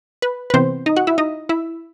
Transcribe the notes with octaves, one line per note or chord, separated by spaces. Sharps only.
B4
B4
C3 E3 B3 C4 C5
D#4 D#5
F#4 F#5
E4 E5
D#4 D#5
E4 E5